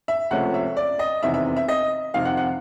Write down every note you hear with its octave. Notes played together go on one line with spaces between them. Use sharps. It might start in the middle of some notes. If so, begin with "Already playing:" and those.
E5
C#2 C3 F3 A3 C#4 F#5
E5
D5
D#5
F1 E2 C3 D#3 E5
E5
E5
D#5
F2 C3 D#3 F5
F#5
F#5